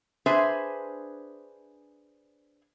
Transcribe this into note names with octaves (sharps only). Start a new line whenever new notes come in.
D4 G#4 B4 C5 E5 G#5